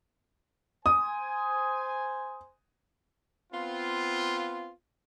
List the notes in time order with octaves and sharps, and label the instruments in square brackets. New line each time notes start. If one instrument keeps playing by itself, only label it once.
[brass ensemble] C5 G#5 [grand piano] D#6
[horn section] B3 C4 F4